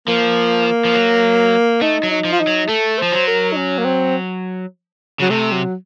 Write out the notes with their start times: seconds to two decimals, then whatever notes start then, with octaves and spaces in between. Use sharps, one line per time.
0.07 F3 A#3
0.85 F3
0.94 F#3
1.81 A3 D#4
2.03 F#3
2.10 D#4
2.25 F3
2.32 F4
2.40 D#4
2.47 F#3
2.69 A3 A4
2.98 F3 C5
3.12 F#3
3.27 A#4
3.52 D#4
3.56 C#4
3.78 A#3
3.85 C4
5.20 C#3 F#3
5.30 C3 A3
5.52 F#3